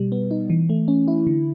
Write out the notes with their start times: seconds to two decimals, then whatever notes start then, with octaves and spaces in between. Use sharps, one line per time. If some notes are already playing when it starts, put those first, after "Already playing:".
Already playing: B2 G3
0.12 B3
0.31 D#4
0.50 E3
0.69 A3
0.88 C#4
1.08 E4
1.27 D3